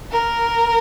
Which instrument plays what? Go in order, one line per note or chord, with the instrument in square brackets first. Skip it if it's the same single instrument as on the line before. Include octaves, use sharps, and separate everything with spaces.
[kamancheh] A#4